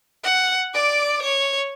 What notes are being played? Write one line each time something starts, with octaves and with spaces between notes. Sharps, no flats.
F#5
D5 D6
C#5